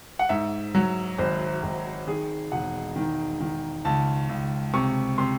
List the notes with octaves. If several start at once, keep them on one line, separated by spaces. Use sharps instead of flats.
F#5
G#2 E5
F#3
G#1 C5
G#1
D#3 G#4
E1 F#5
D#3
D#3
C#2 A5
C#2
C3 C#6
C3 C6